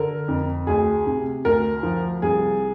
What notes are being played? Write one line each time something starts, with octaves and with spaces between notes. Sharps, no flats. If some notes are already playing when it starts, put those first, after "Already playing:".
Already playing: D3 A#4
F2
D2 G#4
C3
D2 A#4
F3
C2 G#4